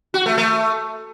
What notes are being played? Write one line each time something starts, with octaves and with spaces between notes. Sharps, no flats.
F#4
A3
A3